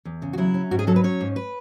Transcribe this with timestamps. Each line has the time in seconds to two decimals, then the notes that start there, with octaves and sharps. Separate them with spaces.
0.05 E2
0.22 C#3
0.33 F#4
0.38 F#3 E4
0.54 C#4
0.71 G#2 F#4
0.79 G#4
0.87 F#3 A4
0.96 B4
1.04 C#4 C#5
1.21 G#2
1.36 B4